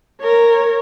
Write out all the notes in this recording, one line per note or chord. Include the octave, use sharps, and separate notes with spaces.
A#4 C#5